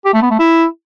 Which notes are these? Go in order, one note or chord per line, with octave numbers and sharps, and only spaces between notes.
G4
A3
B3
A3
E4